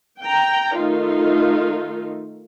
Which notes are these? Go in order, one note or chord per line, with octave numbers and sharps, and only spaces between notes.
G5 A#5
D#3 A3 D#4 F4